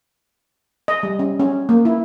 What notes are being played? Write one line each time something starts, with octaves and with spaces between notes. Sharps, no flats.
D#5
G3
C#4
C#4
A#3
E4